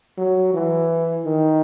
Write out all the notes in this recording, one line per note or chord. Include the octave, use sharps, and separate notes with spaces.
F#3
E3
D#3